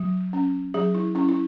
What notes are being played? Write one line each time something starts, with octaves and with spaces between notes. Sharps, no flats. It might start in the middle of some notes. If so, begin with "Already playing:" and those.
Already playing: F#3
C#4
F#3 G#4
E4
C#4 E4
E4